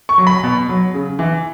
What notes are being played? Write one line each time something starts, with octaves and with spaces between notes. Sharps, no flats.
C#6
F#3
B5
B2
F#3
C#3
E3